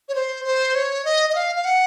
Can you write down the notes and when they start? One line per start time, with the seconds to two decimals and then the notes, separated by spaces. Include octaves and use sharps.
0.09 C#5
0.15 C5
0.45 C5
0.75 C#5
1.05 D#5
1.29 D#5
1.35 F5
1.56 F5
1.65 F#5